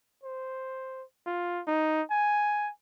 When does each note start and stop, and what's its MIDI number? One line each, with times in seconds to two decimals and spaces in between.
0.24 1.04 72
1.27 1.62 65
1.68 2.02 63
2.11 2.71 80